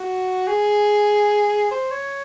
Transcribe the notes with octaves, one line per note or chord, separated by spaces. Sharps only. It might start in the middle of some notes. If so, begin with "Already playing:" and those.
Already playing: F#4
G#4
C5
C#5